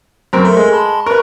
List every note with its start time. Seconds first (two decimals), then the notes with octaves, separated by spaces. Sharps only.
0.33 F#2 C4 A#4
0.45 A3 A4 A#4 C6
0.57 G#3
0.72 A5 B5 C6
1.06 A#4 B4 C#6